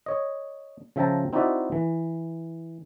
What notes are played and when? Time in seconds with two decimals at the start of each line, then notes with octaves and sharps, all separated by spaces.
0.06 C#5 D#5
0.96 C#3 F3 E5 G5 A5 A#5
1.33 C4 D#4 E4 F#4 D5 E5
1.72 E3